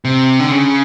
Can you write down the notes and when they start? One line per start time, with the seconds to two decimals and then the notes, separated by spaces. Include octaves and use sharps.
0.05 C3
0.40 D3
0.51 C#3